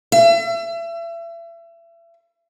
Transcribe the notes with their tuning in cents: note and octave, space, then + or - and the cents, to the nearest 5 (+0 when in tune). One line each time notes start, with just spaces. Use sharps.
E5 +35